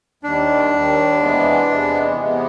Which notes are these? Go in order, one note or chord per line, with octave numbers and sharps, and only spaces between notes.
D#2 D#3 G3 D4
D#2 D#3 G3
E2 C3 E3 G#3 B3
E2 C3 E3 G#3 B3
E2 C3 E3 G#3 B3